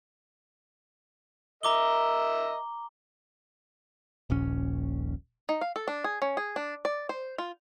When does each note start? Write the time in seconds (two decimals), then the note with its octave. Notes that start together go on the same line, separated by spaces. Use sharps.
1.63 A#4 D#5 E5 A#5 D6 G7
4.30 D#1 A#1 C#4
5.49 D#4
5.61 F5
5.76 A4
5.88 D4
6.04 G#4
6.22 C#4
6.37 G#4
6.56 D4
6.85 D5
7.09 C5
7.38 F4